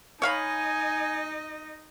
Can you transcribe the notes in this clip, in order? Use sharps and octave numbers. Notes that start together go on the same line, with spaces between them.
D#4 C#5 D#5 F5 G#5 B5